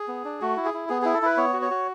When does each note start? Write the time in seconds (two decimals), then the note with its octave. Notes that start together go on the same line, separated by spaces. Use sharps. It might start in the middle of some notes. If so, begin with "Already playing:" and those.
Already playing: G#4
0.08 B3
0.25 D4
0.41 A3 F#4
0.57 E4
0.65 G#4
0.74 E4
0.89 B3 G#4
1.02 E4 G#4
1.14 A4
1.22 E4 B4
1.37 B3 C#5
1.53 F#4
1.62 C#5
1.71 F#4